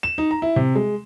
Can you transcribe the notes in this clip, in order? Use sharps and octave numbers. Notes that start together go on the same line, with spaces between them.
E7
D#4
A#5
E4
C3
G#3